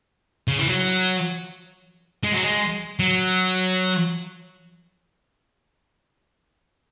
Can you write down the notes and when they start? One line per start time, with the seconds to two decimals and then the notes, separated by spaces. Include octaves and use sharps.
0.48 C#3
0.59 E3
0.69 F#3
2.24 G#3
2.33 F#3
2.43 G#3
3.00 F#3